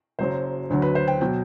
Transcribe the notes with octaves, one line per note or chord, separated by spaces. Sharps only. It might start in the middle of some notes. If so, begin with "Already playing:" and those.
F#1 F#2 F#3 C5
D2 D3 F#3
B4
C5
G5
B2 F#3 G5